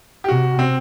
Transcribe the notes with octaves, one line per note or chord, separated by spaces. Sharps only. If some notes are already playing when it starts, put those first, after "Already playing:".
G4
C3 F#4
C4